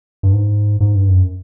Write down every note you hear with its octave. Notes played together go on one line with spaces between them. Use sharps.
G2
G#2
G#2
G2
F#2